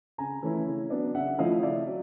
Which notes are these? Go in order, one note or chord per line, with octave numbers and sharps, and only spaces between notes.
C#3 G#5 A#5
E3 A3 C#4 E4
C#3
F#3 B3 D4
C#3 E5 F#5
F3 A3 C#4 E4 D#5 F5
C#3 D5 E5
F#3